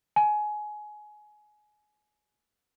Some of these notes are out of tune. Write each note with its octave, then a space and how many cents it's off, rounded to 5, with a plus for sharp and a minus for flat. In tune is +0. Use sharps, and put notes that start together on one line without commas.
G#5 +20